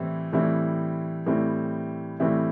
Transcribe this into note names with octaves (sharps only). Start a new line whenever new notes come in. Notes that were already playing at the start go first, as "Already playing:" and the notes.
Already playing: A2 E3 G3 C4 E4
A2 E3 G3 C4 E4
A2 E3 G3 C4 E4
A2 E3 G3 C4 E4